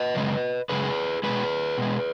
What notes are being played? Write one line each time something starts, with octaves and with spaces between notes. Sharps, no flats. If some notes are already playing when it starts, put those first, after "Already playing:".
Already playing: B4 D#5
F#2 C#3 G#3
F#2 C#3 G#3 G#4 B4
B2 G#3 G#4 B4
B2 G#3